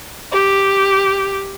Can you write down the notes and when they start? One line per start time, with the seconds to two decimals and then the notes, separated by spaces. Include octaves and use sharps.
0.31 G4